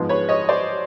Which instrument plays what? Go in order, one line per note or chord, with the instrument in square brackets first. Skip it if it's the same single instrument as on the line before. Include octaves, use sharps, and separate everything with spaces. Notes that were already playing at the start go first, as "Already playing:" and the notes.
Already playing: [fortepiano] G#2 F3 G#3 B3
B4 C#5
C#5 D#5
C5 D5